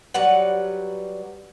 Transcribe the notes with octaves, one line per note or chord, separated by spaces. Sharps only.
F#3 G3 B4 F#5